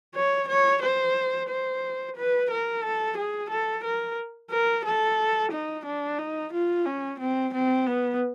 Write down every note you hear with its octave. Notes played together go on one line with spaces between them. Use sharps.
C#5
C#5
C5
C5
B4
A#4
A4
G#4
A4
A#4
A#4
A4
D#4
D4
D#4
F4
C#4
C4
C4
B3